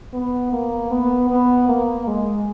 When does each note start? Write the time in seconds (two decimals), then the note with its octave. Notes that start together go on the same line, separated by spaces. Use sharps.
0.13 B3
0.53 A#3
0.91 B3
1.30 B3
1.68 A#3
2.07 G#3